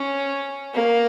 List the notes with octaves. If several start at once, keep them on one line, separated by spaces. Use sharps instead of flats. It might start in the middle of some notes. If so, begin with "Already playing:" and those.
Already playing: C#4
A#3